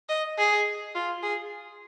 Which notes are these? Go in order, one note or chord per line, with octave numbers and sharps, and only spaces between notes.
D#5
G#4
F4
G#4